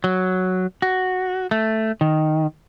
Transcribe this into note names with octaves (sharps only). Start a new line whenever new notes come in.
F#3
F#4
A3
D#3